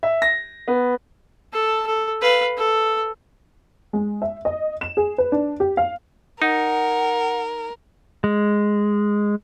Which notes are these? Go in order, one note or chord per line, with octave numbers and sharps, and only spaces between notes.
E5
A#6
B3
A4 A5
A4
B4 F5
A4
G#3
E5
D#5
E7
G#4
B4
D4
G4
F5
D#4 A#4 F#5
G#3